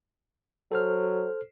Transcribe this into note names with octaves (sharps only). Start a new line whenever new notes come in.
F#3 A4 C5 F6